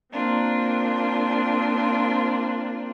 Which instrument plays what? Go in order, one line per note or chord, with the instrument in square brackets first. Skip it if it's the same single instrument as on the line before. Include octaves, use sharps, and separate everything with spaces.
[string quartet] A#3 C4 D4 F4